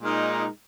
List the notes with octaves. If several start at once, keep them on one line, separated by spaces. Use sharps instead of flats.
A#2 G#3 D#4 A#4